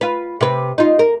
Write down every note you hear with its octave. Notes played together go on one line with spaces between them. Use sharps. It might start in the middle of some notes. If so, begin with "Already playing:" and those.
F4 B4
C3 B4
D#4 F4
A#4